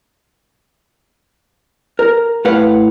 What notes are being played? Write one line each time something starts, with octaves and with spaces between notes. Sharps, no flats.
A#4
A2 B4 F5 F#5